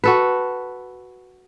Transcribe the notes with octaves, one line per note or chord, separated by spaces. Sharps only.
F#4 A4 B4